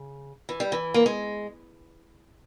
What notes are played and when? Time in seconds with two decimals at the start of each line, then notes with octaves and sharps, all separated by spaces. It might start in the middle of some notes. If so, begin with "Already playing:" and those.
Already playing: C#3
0.49 E3
0.60 G3
0.72 E3
0.94 A#3
1.06 G#3